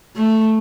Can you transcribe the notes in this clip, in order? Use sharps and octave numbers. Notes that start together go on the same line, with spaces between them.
A3